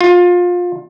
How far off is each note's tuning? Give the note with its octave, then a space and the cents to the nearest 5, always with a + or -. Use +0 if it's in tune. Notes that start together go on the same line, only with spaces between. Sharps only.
F4 +25